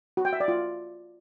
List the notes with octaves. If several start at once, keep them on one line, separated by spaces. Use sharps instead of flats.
F#4
G5
E5
D5
F4